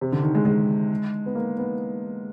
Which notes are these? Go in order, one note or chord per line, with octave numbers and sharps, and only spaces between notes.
C3
D3
D#3
G#3
G#3
B3
A#3
B3